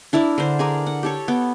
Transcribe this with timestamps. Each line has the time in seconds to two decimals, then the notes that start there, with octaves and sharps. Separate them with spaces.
0.13 D4 E4 A#4 D5
0.38 D3 A#4 C5
0.59 G#4 A#4 D5
0.87 F#5
1.03 G4 A4 C#5
1.28 B3 G5